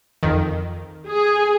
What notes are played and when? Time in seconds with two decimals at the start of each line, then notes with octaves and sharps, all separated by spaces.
0.23 F2 D#3
1.07 G#4